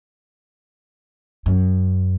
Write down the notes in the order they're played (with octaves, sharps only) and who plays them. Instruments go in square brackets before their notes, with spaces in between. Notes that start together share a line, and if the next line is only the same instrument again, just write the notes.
[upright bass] F#2